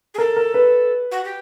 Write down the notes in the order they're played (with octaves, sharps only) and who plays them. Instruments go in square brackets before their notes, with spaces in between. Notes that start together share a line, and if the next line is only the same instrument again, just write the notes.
[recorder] G#4
[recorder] A4 [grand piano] A#4
[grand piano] A#4
B4
[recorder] F#4
G4